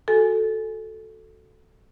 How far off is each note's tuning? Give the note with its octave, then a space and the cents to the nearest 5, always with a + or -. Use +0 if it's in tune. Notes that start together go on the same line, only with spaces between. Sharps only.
F#4 +0 A4 +0 G#5 +0